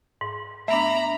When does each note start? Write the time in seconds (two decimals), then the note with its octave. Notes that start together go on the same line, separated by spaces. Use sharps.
0.21 G#2
0.68 A3 B3 D4 E5 A#5 B5